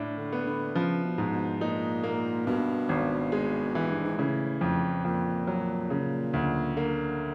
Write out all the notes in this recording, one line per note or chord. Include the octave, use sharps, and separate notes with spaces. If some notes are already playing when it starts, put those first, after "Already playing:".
Already playing: A2 D4
D3
B3
D3
C#3 F3
B2
G#2
B2
A#2 D#4
A#3
G2 B2
G#1
G#3
E3
G2
G#2
A2 C#3
F2
F2 A#2
F#3
C#3
D2
D3 A#3